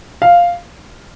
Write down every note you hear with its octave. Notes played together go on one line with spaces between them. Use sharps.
F5